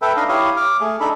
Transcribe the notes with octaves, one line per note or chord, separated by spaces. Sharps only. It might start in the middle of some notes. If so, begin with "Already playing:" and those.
A4 B4 E5 G5
D4 D#4 B4 D#5 F5
E4 G4 C#5 F5 D#6
D6 F6
A3 G#4
D4 D#4 A4 B5